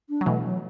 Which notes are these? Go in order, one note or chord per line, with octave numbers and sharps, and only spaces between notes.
D4
F#3
B2 E3 A3
F#3